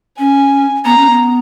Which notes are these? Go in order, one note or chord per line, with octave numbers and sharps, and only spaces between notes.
C#4 G#5
B3 A#5
C#4
B3